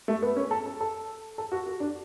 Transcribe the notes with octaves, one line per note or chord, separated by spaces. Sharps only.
A3
B3
C#4
A4
A4
A4
A4
F#4
F#4
D4